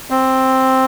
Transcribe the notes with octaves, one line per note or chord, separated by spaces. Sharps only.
C4